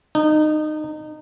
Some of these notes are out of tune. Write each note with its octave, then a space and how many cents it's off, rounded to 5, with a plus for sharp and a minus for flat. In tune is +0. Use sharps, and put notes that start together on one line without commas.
D#4 -25